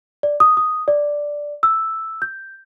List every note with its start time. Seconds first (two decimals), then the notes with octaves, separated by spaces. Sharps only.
0.23 D5
0.40 D#6
0.57 D#6
0.88 D5
1.63 E6
2.22 G6